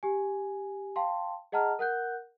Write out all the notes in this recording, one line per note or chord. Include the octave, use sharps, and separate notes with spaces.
G4 G#5
F5 G5 A5 C6
G#4 D#5 F#5 A5 A#5 F6
A#4 F#5 F#6 G6